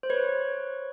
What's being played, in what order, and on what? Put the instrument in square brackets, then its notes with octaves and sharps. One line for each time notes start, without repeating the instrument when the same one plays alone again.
[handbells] C5
B4 C#5